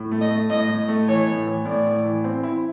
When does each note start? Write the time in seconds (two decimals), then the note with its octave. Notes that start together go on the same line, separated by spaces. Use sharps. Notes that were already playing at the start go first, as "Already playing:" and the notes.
Already playing: A2
0.11 A3
0.21 D#5
0.30 A3
0.50 A2 D#5
0.69 A2
0.79 D#5
0.88 A3
1.08 E3 C#5
1.28 A2
1.47 E3
1.65 A2 D5
1.86 A2
2.05 E3
2.24 C4
2.43 E4